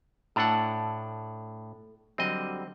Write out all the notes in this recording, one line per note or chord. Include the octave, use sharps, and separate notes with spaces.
A2 D4 A4 F#5 A5
D3 F#3 G3 C4 D#5